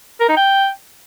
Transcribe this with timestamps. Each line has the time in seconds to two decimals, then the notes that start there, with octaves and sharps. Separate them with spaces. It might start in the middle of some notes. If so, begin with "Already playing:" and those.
0.21 A#4
0.29 D#4
0.37 G5